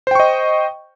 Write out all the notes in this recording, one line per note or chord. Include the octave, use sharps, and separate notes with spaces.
C5 D#5 G5 C#6